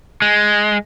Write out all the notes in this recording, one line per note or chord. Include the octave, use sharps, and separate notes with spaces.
G#3